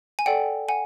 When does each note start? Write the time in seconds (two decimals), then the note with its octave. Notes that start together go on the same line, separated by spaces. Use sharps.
0.19 G#5
0.26 A4 D5 F#5 G5
0.69 F#5 G#5